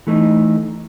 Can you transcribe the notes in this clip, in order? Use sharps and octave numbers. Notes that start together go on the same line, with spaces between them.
E3 A3 D#4